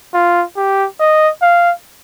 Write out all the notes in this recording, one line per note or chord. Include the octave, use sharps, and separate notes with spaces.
F4
G4
D#5
F5